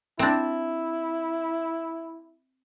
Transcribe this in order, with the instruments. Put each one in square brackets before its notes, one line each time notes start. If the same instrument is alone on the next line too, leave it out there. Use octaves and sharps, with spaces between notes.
[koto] C4 D4 [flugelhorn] E4